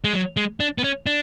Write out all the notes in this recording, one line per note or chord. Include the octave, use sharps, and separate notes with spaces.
G#3
F#3
G#3
D4
B3
C#4
D4